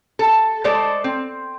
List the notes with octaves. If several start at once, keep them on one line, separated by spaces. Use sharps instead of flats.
A4
G#3 A3 A4 C5 D5
C4